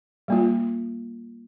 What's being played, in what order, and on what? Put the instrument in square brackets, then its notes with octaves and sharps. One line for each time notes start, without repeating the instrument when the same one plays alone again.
[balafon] G3 A#3 F4